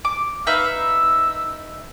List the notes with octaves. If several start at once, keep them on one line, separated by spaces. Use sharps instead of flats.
D6
D#4 B4 E5 F5
E6